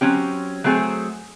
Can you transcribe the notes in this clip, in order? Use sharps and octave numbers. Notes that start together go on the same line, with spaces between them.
F#3 C4 C#4 G4
F#3 A3 C4 G#4